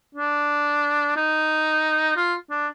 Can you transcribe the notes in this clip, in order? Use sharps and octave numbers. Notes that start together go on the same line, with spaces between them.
D4
D#4
F4
D4